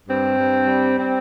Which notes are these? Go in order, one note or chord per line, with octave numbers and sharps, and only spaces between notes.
G2 C4
G2
G3
C4